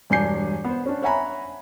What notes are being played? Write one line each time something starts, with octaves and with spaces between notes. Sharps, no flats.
E1 G2 D5 G#5 G6 C7
B3 C5
C#4 D4
C#5 E5 F#5 G#5 A#5 B5